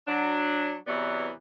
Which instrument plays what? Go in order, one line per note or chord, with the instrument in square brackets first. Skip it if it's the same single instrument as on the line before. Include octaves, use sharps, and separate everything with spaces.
[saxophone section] F#3 D4
E2 C3 E3 F#3 B3 D5